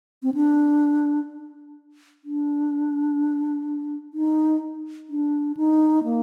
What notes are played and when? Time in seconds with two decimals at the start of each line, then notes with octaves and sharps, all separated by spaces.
0.23 C4
0.34 D4
2.24 D4
4.14 D#4
5.10 D4
5.57 D#4
6.04 A#3